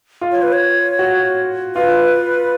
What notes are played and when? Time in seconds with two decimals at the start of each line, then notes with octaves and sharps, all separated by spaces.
0.21 F4
0.31 C#5
0.42 B4
0.53 C#5
0.99 F#4
1.75 F4 B4